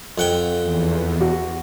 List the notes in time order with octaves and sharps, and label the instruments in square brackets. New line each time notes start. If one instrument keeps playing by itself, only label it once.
[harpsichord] F2 F#5 G5
[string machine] E2
[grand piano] F#4